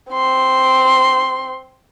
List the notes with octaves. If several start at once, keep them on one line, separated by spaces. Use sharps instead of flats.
C4 C6